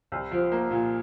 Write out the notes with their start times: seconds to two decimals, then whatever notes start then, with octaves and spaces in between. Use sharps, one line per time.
0.12 C2
0.32 F3
0.52 A#3
0.71 A#2